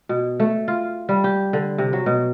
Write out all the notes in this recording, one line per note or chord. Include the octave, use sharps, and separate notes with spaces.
B2
A3
F4
G3
G4
D3
C3
F#3
B2